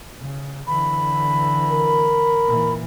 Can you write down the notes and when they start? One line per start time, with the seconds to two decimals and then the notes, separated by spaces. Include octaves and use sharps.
0.18 C#3
0.67 D3 E3 B5
1.70 A#4
2.45 A#2 E3